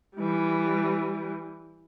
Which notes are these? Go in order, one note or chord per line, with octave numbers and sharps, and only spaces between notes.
E3 G3